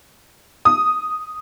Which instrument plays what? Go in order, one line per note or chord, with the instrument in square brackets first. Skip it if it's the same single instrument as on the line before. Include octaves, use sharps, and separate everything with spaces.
[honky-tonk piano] D#6